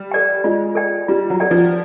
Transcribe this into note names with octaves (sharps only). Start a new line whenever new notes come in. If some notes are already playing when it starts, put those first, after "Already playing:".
Already playing: G3
A4 D5 G5
G#3 F4
A4 D5 G5
G3 F4
F#3
A4 D5 G5
F3